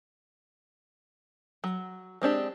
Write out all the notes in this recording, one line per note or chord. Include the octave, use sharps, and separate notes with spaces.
F#3
G#3 C4 D4 G4